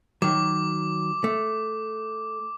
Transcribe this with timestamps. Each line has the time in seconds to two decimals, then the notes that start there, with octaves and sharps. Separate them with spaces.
0.22 D#3 F#3 D6
1.24 A3